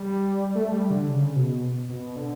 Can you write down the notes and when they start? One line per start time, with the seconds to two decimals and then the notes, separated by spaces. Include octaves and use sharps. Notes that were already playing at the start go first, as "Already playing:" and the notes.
Already playing: G3
0.55 A3
0.72 G3
0.91 D3
1.09 C#3
1.36 B2
1.89 B2
2.16 D3